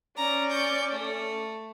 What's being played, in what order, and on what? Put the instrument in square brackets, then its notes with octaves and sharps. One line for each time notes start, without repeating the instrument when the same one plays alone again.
[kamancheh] C#4 D5 [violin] A#5
[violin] C#6 G6
A3